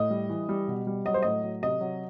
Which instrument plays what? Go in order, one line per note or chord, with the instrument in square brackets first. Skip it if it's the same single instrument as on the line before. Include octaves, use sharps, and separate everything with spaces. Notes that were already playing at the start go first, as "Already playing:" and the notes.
Already playing: [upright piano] A2 D#5
G3
E3
G3
B2
G3
F#3 D#5
C5
A2 D#5
F#3
C3 D#5
F#3